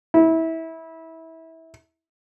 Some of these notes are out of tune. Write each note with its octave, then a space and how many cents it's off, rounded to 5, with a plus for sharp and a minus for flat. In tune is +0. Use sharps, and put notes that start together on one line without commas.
E4 -25